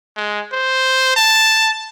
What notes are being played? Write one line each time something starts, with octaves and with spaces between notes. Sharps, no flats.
G#3
C5
A5